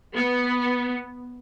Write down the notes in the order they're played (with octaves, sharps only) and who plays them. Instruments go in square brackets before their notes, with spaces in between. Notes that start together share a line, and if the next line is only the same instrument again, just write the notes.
[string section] B3